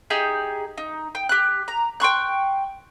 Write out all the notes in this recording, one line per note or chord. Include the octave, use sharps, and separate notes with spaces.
D#4 G4 G#4
D#4
G5
G4 F#6
A#5
G5 C6 C#6 F#6